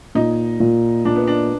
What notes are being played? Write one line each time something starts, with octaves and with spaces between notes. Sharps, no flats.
A#2 D#4
A#2
A#2 D4
B3
D4